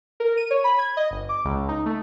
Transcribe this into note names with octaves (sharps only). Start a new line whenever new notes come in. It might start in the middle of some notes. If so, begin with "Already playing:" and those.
A#4
D#7
C#5
B5
G#6
D#5
G1
D6
C#2
D#4
A3